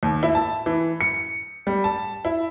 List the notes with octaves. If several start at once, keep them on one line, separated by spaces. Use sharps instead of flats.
D#2
E4
A5
E3
C#7
G3
A5
E4